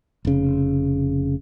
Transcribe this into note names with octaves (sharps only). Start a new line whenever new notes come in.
F1 C#3